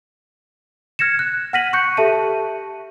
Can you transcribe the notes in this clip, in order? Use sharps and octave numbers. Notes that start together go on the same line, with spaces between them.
F6 G#6 A#6 C#7 E7
F#6
F#5 F6 A#6 B6 D#7 F#7
C#6 F#6 G6 C#7
G4 A4 E5 A5 D#7